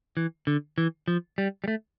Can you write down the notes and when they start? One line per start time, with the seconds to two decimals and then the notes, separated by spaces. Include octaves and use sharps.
0.17 E3
0.47 D3
0.78 E3
1.08 F3
1.38 G3
1.64 G3
1.68 A3